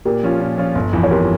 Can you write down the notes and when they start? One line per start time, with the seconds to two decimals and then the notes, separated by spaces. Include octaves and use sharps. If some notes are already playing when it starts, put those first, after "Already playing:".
0.05 A#2 G4 A#4
0.23 F3 C#4 F4
0.41 A#2
0.58 F3 C#4 F4
0.75 G1
0.93 F2 E3
1.03 C#5
1.10 G1 G4 A#4